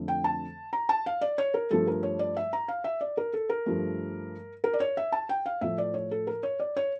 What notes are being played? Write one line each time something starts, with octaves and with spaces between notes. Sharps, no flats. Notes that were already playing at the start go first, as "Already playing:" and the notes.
Already playing: F2 D3 A3
G5
A5
A#5
A5
F5
D5
C#5
A#4
G2 F3 A3 A4
A#4
C#5
D5
E5
A#5
F5
E5
D5
A#4
A4
A#4
G2 F3 A3
A#4
D5
C#5
E5
A5
G5
F5
A2 F3 A3 E5
D5
C#5
A4
A#4
C#5
D5
C#5